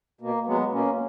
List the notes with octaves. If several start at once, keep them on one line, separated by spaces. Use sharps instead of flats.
B2 A#3
F#3 G#3 B3
B2 A#3 C#4